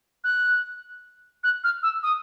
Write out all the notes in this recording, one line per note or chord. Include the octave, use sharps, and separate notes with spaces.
F#6
F#6
F6
E6
D#6